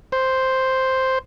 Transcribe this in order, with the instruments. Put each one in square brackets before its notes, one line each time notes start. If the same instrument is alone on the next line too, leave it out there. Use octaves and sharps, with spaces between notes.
[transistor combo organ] C5